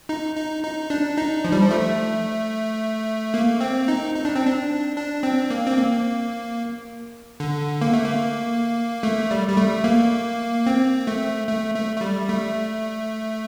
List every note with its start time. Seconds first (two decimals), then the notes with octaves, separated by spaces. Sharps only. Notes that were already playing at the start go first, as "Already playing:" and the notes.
0.09 D#4
0.36 D#4
0.63 D#4
0.90 D4
1.17 D#4
1.44 F3
1.52 G3
1.61 F3
1.71 A3
3.34 A#3
3.60 C4
3.88 D#4
4.15 D#4
4.25 D4
4.36 C4
4.47 D4
4.96 D4
5.23 C4
5.50 A#3
5.67 C4
5.78 A#3
7.40 D3
7.82 A#3
7.93 A3
8.04 A#3
9.03 A3
9.31 G3
9.48 G3
9.57 A3
9.84 A#3
10.66 C4
11.07 A3
11.47 A3
11.75 A3
11.96 A3
12.01 G3
12.29 A3